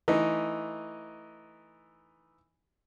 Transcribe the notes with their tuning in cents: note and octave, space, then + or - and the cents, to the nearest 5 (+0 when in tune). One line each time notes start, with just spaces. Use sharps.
E3 +0 A3 +0 D#4 +0